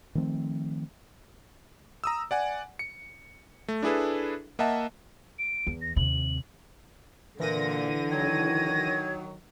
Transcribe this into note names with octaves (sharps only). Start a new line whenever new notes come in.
D#3 F3 A3 C4
A#5 D#6 E6
D5 F#5 G#5
C#7
A3
D4 E4 G#4 A4 B4
A#3 D#5 E5 F#5 A5
D7
E2
A#6
D#2 C3 F#7
A#2 D3 E3 A#6 D#7
D#3 F#3 G#6